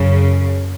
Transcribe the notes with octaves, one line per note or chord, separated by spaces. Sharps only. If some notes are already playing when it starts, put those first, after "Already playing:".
Already playing: F#2 C#3